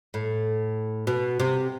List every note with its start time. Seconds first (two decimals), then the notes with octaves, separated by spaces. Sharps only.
0.14 A2
1.07 B2
1.39 C3